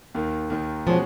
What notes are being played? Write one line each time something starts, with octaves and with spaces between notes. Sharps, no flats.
D#2 D#3 A#3
D#2 D#3 A#3
B2 F3 G#3 C#4 F#4